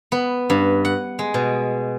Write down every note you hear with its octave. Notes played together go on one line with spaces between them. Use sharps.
B3
G2
F#5
G#3
B2